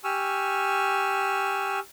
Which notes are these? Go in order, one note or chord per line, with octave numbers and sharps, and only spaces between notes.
G4 G#5 C#6 E6 F6